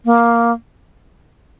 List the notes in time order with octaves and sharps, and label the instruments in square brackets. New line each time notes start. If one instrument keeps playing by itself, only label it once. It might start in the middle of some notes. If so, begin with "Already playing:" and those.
[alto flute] A#3